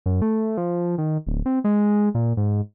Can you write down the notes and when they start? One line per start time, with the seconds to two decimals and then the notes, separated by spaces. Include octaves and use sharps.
0.06 F#2
0.22 A3
0.57 F3
0.98 D#3
1.27 D1
1.46 C4
1.64 G#3
2.15 A#2
2.37 G#2